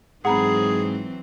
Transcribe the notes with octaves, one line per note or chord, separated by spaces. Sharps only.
G#2 E3 F#3 C4 G#4 F#5 A#5 B5